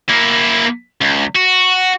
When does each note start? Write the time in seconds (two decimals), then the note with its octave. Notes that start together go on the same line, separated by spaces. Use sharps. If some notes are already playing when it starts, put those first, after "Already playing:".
0.10 A#3 E4
1.01 C#2
1.35 F#4